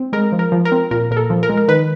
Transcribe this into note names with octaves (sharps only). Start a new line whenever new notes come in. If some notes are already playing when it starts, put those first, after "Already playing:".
Already playing: C4
G#3 A#4
F3
A#4
F3
A#4
C4
A#2 A#4
A#2 A#4
A4
F3
A#4
G#3
A#4
D#3 B4